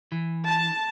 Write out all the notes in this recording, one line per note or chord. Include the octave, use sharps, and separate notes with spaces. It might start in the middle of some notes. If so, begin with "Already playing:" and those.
E3
A5